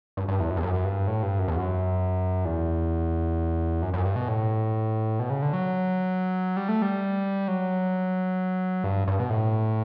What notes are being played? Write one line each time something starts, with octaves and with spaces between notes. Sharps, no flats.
G2
G2
E2
F#2
E2
F#2
G2
A2
G2
F#2
E2
F#2
E2
F#2
F#2
G2
B2
A2
B2
C#3
D3
F#3
G3
A3
G3
F#3
G2
G2
B2
A2